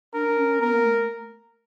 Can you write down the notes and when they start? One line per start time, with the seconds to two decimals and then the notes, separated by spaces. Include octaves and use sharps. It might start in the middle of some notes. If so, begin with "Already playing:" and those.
0.14 D4 A#4
0.28 D4
0.37 C#4
0.61 B3 A#4
0.74 A#3
0.85 A3